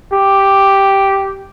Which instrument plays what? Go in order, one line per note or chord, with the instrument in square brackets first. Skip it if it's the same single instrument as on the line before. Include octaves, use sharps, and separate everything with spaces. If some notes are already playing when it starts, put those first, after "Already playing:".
[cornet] G4